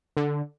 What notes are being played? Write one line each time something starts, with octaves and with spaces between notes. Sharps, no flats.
D3